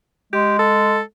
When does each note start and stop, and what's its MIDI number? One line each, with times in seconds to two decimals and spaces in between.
0.33 1.01 56
0.33 0.57 67
0.59 1.01 69